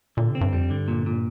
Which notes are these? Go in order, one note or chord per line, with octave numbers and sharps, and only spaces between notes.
A#2 D3
C3
C4
G2
F2 G3
G2 D3
A#2
A#2